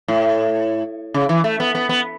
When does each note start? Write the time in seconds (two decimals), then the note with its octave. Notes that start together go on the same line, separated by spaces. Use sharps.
0.08 A2
1.14 C#3
1.29 E3
1.44 A3
1.60 B3
1.75 B3
1.89 B3